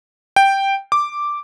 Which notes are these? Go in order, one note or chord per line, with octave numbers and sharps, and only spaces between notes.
G5
D6